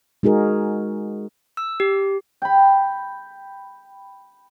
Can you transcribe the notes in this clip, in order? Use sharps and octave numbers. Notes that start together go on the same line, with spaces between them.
G#3 D#4 F#4 G#4 A#4
E6
G4
G5 B5